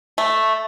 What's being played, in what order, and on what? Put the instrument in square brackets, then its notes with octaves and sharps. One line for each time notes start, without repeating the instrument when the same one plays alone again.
[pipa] A3